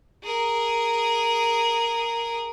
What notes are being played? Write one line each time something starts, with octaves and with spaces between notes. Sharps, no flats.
G#4 A#4